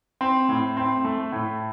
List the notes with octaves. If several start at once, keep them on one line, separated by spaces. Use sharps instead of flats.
C4
A2
C4
A3
A2